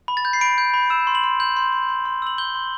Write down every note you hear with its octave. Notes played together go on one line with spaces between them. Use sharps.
B5
A6
G6
C7
B5 D7
G6
B5
E6 E7
C6
F#7
C6
G6 F#7
C6
C6
C6
C6
E6 F#7
G6 G7
C6